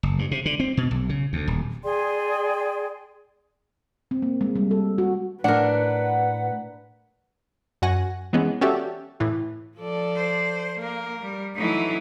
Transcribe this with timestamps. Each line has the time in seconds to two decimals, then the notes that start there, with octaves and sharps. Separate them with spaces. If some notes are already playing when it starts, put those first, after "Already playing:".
0.03 F#1
0.19 G2
0.31 C3
0.46 D3
0.60 C4
0.77 B2
0.91 B1
1.09 C#3
1.33 D2
1.48 D#1
1.84 G#4 D5 G5 C6
4.11 C4
4.22 A#3
4.41 G#3
4.56 G3
4.71 A4
4.98 F#4
5.44 A2 D4 A#4 B4 F#5
7.82 F#2 F#4 F#5 G#5 A#6
8.33 E3 G#3 B3 C#4
8.61 C#4 F#4 G4 A4 D5 E5
9.20 A2 E3
9.77 F3 A4 D5
10.16 C5
10.80 A#3 A#4
11.22 G3
11.55 E3 F#3 A3 D#4 E4